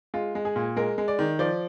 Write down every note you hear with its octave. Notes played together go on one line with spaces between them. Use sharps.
G#3 F4
G#3
G#4
A#2
G#3 A#4
G#3
D5
D#3
F3 D5